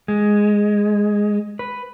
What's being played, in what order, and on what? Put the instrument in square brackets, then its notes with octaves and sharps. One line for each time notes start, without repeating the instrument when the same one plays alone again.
[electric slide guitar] G#3
B4